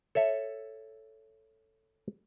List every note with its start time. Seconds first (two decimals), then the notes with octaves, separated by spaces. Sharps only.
0.15 A4 C#5 E5